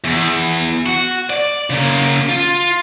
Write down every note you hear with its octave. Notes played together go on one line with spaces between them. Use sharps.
E2
F#4
D5
C#3 A#3
F4